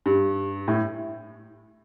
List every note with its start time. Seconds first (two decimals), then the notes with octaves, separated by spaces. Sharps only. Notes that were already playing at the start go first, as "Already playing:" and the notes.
0.06 G2
0.68 A2